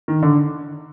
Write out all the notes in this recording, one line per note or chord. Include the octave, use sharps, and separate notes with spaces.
D#3
D3